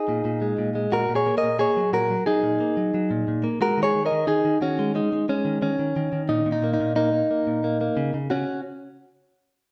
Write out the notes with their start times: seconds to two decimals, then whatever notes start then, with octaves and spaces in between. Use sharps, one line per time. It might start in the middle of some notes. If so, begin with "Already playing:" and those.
Already playing: D#4 G#4
0.09 A#2
0.25 A#2
0.42 G#3
0.58 A#2
0.75 G#3
0.92 A#2 F#4 A#4
1.09 A#2
1.15 G#4 C#5
1.27 A#3
1.38 A#4 D#5
1.44 A#2
1.59 A#3 G#4 C#5
1.77 F#3
1.93 A#2 F#4 A#4
2.11 F#3
2.26 F#3 D#4 G#4
2.43 A#2
2.60 A#3
2.77 F#3
2.94 F#3
3.11 A#2
3.28 A#2
3.44 A#3
3.61 G#3 F#4 A#4
3.78 D#3
3.83 G#4 C#5
3.95 D#3
4.06 A#4 D#5
4.12 D#3
4.27 D#3 D#4 G#4
4.45 D#3
4.61 D#3 C#4 F#4
4.79 G#3
4.95 G#3 D#4
5.13 G#3
5.29 G#3 C#4
5.45 D#3
5.62 D#3 C#4
5.79 D#3
5.96 D#3
6.13 D#3
6.29 A#2 D#4
6.46 A#2
6.52 D#4
6.64 A#3
6.74 D#4
6.80 A#2
6.96 A#3 D#4
7.13 A#3
7.31 A#3
7.47 A#2
7.64 A#3
7.81 A#3
7.97 C#3
8.14 C#3
8.30 C#3 C#4 F#4